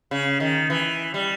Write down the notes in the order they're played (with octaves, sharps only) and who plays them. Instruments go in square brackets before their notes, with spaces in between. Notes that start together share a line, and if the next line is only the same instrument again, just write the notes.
[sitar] C#3
D#3
E3
G3